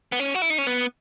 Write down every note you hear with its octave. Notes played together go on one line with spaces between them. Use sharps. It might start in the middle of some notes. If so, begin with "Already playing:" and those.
B3
C#4
F#4
E4
D#4
C#4
B3